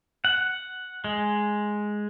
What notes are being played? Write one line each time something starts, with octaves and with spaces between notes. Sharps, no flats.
F#5
G#3